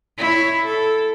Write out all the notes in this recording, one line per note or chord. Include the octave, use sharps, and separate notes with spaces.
E4 C#5
A4